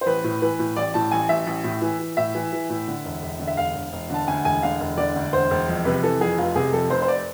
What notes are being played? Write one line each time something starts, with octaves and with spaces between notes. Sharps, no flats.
C5
A1 B4
A2
E3 B4
A2
A1 D5
A2 A5
A1 G#5
A1 E5
A1
A2
E3
E3
A2 E5
E3
E3
A2
D3
E1
E1
D3
E5
E1 F5
E1
E1
D3 A5
D2 G#5
E1 G#5
D3 F5
E1
D3 D5
D2
E1 C5
E1
F2
C3 B4
E3 A4
F2 G#4
F1 F4
C3 G#4
F2 A4
F1 C5
C5
D5